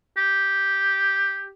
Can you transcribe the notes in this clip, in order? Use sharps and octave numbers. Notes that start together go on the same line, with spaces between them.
G4